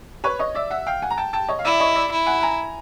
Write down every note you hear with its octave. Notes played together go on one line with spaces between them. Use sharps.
B4 C#5
C#5 D#5
D5 E5
E5 F#5
F5 G5
F#5 G#5
A#5
G5 A5
G5 A5
C#5 D#5
F5
E4 D5 E5
C#5 D#5
D5 E5
E4
F#5 G#5
G#5 A#5